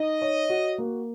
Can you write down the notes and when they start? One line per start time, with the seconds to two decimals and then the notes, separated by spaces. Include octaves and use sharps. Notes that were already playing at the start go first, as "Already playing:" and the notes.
Already playing: D#4 D#5
0.22 C#5
0.50 F#4
0.78 A#3